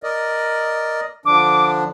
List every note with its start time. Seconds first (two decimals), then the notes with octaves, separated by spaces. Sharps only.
0.03 A#4 D5 D#5
1.26 D3 F3 D4 D6